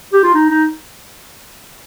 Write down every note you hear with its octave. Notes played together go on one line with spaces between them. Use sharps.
G4
F4
D#4
D#4